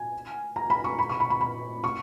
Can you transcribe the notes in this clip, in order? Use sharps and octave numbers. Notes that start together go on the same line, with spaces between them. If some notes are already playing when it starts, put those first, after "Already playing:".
Already playing: G#5
A#5
B5
C#6
B5
C#6
B5
B5
B5
C#6